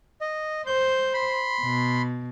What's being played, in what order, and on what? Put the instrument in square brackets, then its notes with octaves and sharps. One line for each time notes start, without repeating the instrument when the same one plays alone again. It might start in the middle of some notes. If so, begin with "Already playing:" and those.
[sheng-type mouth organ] D#5
[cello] C5 [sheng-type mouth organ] G6
[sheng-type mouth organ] B5 C6
[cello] B2